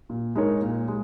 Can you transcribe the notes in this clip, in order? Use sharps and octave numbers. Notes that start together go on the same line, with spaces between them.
A#2
G#3 D#4 A#4 C#5
A#2
G#3